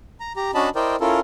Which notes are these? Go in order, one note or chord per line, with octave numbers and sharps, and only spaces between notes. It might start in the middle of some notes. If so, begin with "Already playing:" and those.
A#5
G4 A#5
C#4 D4 F#4 D#5 A5 B5
E4 A#4 C5 D5 D#5 G5
C#4 E4 F4 A4 A#4